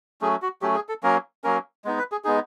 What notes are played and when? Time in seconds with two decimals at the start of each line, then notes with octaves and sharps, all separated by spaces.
0.21 F#3 A3 C#4 G#4
0.42 F#4
0.62 F#3 A3 C#4 G4
0.75 G#4
0.89 A4
1.03 F#3 A#3 C#4 A#4
1.44 F#3 A#3 C#4 A#4
1.85 G#3 B3 D#4
1.98 B4
2.12 G#4
2.24 G#3 B3 D#4 G#4